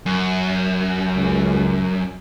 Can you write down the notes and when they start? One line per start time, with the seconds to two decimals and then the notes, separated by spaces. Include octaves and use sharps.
0.06 F#2
1.08 C#2